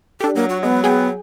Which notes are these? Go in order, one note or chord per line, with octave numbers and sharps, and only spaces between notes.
D4 G4 A4
F#3 A#3
F#4
G#3 B3
B3 G#4 G5 G#5